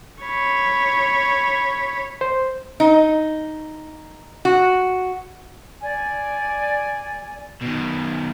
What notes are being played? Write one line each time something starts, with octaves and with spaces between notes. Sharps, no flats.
C#5 B5
C5
D#4
F#4
D5 G#5
B2 D#3